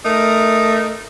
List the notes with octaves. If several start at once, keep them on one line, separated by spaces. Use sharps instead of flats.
A3 D#4 A#4